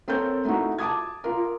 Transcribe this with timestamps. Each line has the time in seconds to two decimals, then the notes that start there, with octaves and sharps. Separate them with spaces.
0.08 C4 A4 A#4 C#5 G6
0.45 A3 D#4 E4 F#4
0.78 A5 D6 D#6 G#6
1.24 F4 A#4